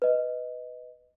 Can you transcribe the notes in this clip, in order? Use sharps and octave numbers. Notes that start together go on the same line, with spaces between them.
B4 D#5